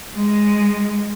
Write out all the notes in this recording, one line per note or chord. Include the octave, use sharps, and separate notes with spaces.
G#3